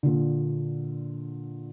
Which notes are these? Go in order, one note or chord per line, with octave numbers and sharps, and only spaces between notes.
A#2 D3